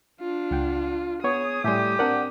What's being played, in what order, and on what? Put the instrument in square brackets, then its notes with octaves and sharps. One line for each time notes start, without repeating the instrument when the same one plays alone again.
[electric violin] D4 F4
[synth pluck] C#2 F#5 G5
[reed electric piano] B3 C#5 [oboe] G#4 [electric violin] D#6
[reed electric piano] A2 G3 [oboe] G4 [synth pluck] E5 G#5 C6
[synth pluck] C4 D4 A#4 [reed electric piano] D5 F#5